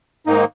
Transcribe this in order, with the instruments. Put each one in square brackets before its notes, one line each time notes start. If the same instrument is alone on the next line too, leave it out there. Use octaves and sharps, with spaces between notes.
[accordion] G#2 D#3 A#3 D#4